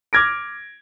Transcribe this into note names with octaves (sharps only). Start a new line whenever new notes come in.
D6 F6 G#6 A#6 D7